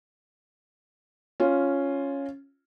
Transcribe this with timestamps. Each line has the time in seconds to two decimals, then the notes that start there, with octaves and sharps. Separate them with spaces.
1.40 C#4 F4